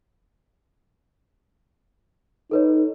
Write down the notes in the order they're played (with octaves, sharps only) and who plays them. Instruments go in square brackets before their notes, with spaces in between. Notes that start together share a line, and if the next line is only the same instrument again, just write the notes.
[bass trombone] D#4 [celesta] A4 B4 C#5